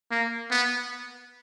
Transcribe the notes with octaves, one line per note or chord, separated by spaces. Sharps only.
A#3
B3